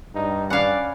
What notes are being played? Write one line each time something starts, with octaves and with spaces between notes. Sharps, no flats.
G2 D#4
C#4 D5 F5 F#5 G#5 B5